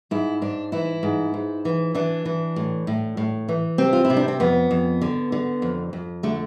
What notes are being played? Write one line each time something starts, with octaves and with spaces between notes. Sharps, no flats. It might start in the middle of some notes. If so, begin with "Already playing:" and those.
G#2 E4
G#2 D4
E3 E4
G#2
G#2
E3
E3 D4
E3
A2
A2
A2
E3
C3 C4
F4
E4
C3
D4
C4
F2 B3
F2
D3
D3
F2
F2
D3 A3